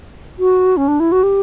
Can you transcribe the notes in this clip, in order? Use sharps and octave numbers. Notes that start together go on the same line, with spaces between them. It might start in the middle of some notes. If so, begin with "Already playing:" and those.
F#4
C#4
D4
E4
F#4
G4